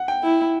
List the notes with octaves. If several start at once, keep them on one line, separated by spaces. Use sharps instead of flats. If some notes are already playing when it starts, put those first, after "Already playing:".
Already playing: F#5
G5
E4